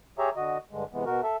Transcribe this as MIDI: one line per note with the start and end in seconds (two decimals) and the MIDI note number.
0.19 0.30 67
0.19 0.30 68
0.19 0.30 73
0.19 0.30 76
0.19 0.30 82
0.36 0.58 50
0.36 0.58 66
0.36 0.58 75
0.71 0.84 43
0.71 0.84 50
0.71 0.84 56
0.93 1.04 48
0.93 1.04 52
0.93 1.04 56
0.93 1.04 59
1.06 1.21 47
1.06 1.21 66
1.06 1.21 70
1.23 1.37 69
1.23 1.37 76